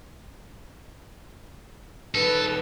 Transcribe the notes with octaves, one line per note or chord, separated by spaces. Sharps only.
D#3 G3 A4 B4